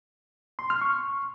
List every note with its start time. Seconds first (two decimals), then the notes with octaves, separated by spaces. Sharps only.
0.59 C6
0.70 F6
0.81 C#6